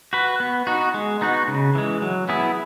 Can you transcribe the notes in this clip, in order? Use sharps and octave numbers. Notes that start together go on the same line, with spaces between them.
F#4 B4
B3
D#4 F#4
G#3
B3 D#4 F#4
C#3
E3 G#3
F#3
B3 E4 G#4